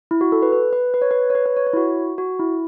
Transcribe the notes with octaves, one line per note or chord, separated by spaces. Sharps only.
E4
F#4
A4
B4
B4
B4
B4
C#5
B4
C#5
B4
B4
C#5
C#5
E4
F#4
F#4
E4